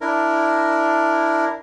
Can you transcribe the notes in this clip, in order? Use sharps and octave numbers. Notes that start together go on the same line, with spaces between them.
D4 E4 A#4